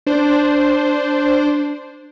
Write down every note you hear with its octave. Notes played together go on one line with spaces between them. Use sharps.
D4 C5